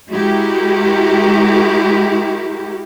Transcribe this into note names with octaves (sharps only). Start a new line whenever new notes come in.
G#3 E4 F#4 G4 A#4